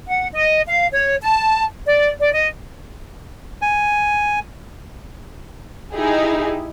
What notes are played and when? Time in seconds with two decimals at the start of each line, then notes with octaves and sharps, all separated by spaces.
0.08 F#5
0.32 D#5
0.66 F5
0.92 C#5
1.22 A5
1.86 D5
2.20 D5
2.34 D#5
3.62 G#5
5.94 D#4 E4 G4 G#4